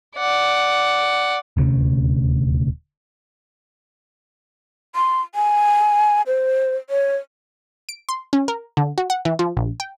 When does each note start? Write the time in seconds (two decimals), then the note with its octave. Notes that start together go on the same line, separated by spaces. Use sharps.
0.17 D5 F#5
1.57 D#1 D2 C3 C#4
4.95 C6
5.35 G#5
6.27 C5
6.90 C#5
7.89 D7
8.09 C6
8.33 C#4
8.48 A#4
8.77 D3
8.98 F#4
9.10 F#5
9.25 E3
9.39 F3
9.57 A#1
9.80 G5